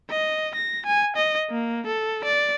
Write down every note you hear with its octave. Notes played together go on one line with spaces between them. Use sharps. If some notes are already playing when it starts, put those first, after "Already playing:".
D#5
A#6
G#5
D#5
A#3
A4
D5